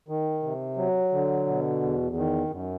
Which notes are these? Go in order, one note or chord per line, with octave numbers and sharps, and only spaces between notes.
D#3
C3
F#3
D3
B2
E2
D#3
F#2